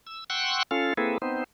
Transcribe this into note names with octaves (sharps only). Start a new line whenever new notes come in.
E6
F#5 G5 C6 C#6 E6 F#6
C#4 F4 A4 F5
A#3 C4 E4 G#4 A4 B4
B3 C4 D#4 C5